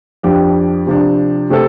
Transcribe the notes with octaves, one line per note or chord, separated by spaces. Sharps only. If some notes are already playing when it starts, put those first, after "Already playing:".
F2 F3 D4 G4
C3 F3 D4
C3 A3 C4 A4